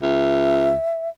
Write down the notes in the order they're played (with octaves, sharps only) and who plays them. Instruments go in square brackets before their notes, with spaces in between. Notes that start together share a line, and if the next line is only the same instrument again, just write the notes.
[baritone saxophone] C#2 [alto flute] E5